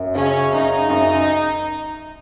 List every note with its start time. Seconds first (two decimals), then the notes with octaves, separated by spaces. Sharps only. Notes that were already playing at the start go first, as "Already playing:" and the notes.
Already playing: F#2
0.15 C#3 C#4
0.53 F#2 D#4
0.90 F#2